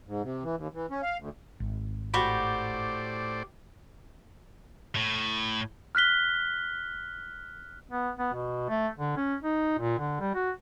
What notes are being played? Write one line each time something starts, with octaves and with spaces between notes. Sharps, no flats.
G#2
C3
E3
D#2
E3
C#4
F5
D2
G#1
A2 F#4 G4 C5 D5 B5
A2
F6 F#6 B6 G7
B3
B3
B2
A3
D3
C#4
D#4
A#2
D3
G3
F#4